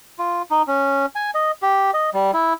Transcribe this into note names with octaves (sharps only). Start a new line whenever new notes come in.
F4
D#4
C#4
G#5
D#5
G4
D#5
G3
E4